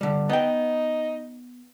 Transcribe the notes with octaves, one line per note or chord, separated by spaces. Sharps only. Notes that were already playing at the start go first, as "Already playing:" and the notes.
D3 G3
B3 D#4 G5